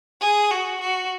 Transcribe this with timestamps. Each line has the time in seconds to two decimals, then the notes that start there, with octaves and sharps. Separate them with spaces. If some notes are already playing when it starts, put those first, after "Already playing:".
0.21 G#4
0.51 F#4
0.81 F#4